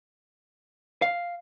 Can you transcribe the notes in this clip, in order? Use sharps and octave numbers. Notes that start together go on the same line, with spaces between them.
F5